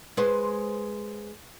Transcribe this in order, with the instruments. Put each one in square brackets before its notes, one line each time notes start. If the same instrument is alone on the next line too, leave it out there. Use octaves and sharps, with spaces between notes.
[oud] G#3 B4 C5